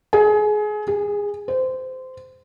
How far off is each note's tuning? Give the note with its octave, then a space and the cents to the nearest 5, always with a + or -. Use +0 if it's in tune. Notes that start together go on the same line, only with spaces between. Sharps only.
G#4 +25
G#4 -20
C5 -20